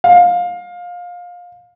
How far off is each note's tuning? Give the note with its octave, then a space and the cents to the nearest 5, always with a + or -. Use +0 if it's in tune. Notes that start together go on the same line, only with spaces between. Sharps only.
F5 +20